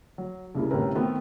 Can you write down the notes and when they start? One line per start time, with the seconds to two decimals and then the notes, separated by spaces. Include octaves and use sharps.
0.18 F#3
0.55 C2 C#3 A#3 E4
0.70 G1 A2 C3 C#4 A#4 B4
0.95 D#3 A3 B3 C4